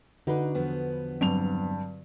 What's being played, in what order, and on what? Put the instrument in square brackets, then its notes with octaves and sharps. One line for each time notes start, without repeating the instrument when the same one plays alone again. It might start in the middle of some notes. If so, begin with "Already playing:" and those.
[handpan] D3 F#4 B4 [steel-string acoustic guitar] D4 D#4
[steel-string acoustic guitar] E2 F3 B3
[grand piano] G2 F7 [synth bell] F#3 C4